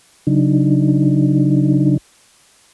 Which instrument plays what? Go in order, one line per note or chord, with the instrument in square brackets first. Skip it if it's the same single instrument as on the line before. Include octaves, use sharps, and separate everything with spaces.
[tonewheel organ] C#3 F#3 D4 D#4